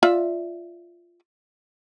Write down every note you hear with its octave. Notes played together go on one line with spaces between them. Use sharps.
F4 D5 E5